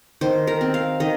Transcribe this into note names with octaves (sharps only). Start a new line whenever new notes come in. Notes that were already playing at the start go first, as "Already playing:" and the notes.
D#3 C5
A#4
C4
F5
D#3 D#5